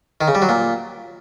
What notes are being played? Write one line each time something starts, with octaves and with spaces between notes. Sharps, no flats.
D#3
C#3
G3
F#3
A#2